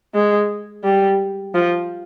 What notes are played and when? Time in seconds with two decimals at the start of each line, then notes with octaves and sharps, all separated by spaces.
0.14 G#3
0.84 G3
1.55 F3